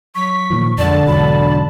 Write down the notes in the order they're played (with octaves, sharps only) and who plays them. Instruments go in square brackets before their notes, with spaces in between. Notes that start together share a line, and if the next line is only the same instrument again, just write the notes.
[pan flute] F#3 [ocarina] C#6 [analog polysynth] B6
[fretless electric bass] A#2 D#3 F3
[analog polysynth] B1 D3 A5 [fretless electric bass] F2 G#3 [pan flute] D5
[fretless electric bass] E2 G#2 F#3 [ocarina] B5